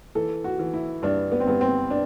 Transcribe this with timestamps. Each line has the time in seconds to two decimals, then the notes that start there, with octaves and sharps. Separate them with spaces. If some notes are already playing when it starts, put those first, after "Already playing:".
0.15 E3 A4
0.44 F#4
0.59 E3
0.74 E4
1.02 G2 D4
1.32 B3
1.40 C4
1.47 G2 B3
1.61 C4
1.90 D4